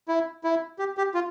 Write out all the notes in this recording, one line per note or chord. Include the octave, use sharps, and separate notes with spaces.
E4
E4
G4
G4
F4